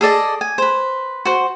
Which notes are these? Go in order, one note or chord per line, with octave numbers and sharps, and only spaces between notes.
G#4 A4 D5 D#5
G#5
B4 C5
F#4 C5